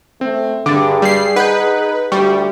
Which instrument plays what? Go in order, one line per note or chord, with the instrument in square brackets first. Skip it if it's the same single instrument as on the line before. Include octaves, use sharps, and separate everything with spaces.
[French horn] A3 [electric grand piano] C4
[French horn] G2 [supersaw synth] D3 [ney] G#4 [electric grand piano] D6 A6
[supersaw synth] G3 C7 [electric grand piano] D5
[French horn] D#4 [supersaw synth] B4 [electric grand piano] F#5 G6
[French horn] D2 [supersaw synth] G3 [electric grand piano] C#6